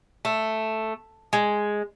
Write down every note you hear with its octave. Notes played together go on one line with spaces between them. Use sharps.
A3
G#3